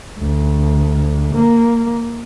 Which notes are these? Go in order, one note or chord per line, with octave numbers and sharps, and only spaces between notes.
D2
A#3